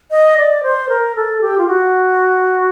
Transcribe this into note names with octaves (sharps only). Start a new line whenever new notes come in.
D#5
D5
C5
A#4
A4
G4
F4
F#4